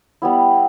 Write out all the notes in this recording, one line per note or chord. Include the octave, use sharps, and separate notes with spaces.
G3 B3 E4